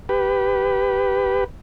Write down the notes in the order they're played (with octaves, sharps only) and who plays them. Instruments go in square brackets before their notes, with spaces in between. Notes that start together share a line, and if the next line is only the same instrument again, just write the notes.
[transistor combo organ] G4 B4